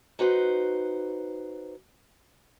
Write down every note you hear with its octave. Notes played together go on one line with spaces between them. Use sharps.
D#4 F#4 B4 C5